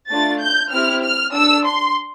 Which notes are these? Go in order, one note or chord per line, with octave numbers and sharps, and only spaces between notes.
A3 D4 F4 A6
G6
C4 E4 G4 F6
F6
D4 A4 E6
C6